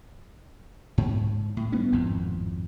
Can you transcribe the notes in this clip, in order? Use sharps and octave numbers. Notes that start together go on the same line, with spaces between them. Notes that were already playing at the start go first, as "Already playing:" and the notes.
G#2
A2
G3 B3 C#4
G#1 F2 A2